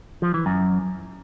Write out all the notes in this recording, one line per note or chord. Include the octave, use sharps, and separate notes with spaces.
F3
E3
F#2